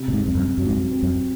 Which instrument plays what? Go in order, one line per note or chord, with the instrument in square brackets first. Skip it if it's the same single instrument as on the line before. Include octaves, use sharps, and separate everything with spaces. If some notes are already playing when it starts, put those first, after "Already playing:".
Already playing: [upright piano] C3
[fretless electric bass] A#2
G#2
[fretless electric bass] F2 [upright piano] C3
[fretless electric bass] F#2
[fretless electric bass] F#2 [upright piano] F#3
[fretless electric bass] G#2
F#2
[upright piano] C4
[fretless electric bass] F#2